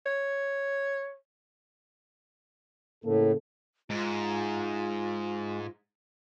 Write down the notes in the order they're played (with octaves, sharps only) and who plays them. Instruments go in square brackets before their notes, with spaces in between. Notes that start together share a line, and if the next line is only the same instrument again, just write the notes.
[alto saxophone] C#5
[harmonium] A2 [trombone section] C#3 A#3 A4
[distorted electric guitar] G#2 [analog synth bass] G#3 [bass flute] F4